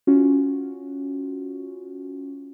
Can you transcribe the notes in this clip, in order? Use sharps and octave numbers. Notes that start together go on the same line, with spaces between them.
C#4 F4 F#4